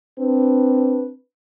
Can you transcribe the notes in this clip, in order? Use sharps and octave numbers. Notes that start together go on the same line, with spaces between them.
C4 D4 B4